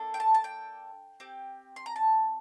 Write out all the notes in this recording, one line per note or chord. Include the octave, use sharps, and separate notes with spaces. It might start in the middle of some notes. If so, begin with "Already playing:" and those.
Already playing: A#3 D4 A4
G5
A5
A5
G5
C4 G4
C6
A#5
A5